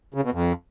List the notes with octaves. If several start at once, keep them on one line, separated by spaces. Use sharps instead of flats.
C#3
B2
F2